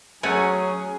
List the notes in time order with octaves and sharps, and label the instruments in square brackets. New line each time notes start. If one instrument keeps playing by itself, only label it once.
[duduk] F#3 [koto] A3 C#4 F#4 [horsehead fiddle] G#4